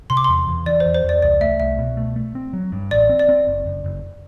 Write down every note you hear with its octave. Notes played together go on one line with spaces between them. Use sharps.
C3 C6
D6
E2 C6
E2
E3 D5
E2 C5
C5
E2
D5
C2 D5
A3 E5
C2 E5
B2
A3
A3
C4
F#3
G2
A1 D5
C4
D5
C4
F#1
F#1
F#1